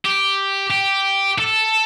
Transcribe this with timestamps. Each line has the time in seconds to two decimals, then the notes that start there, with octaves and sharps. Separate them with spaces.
0.05 G4
0.71 G4
1.39 A4